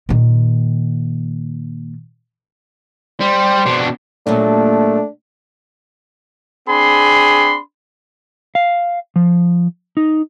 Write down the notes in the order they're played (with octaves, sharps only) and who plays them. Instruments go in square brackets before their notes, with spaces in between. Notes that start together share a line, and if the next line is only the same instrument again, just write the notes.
[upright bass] A#2 D#3
[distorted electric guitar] G3 [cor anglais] C5
[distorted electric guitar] B2 D4
[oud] A#2 F#3 G3 [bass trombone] A3 [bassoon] D4
[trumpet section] C4 D4 G#4 B5 C6
[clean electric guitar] F5
F3
D#4